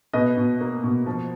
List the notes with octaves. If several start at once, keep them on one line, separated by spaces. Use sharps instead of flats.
B2 B4 D#5
B2
A#3
B2
F3